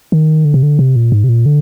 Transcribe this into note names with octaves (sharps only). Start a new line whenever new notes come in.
D#3
D3
C3
D3
C3
A#2
G#2
C3
A#2
D3